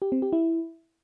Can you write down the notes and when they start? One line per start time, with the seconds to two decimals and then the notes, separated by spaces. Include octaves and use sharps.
0.02 G4
0.12 C4
0.22 G4
0.33 E4